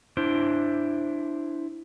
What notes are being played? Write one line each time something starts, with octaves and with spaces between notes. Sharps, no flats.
D4 E4 C5